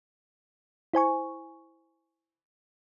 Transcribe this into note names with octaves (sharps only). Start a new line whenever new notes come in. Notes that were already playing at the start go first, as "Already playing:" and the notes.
E4 C5 G#5 C#6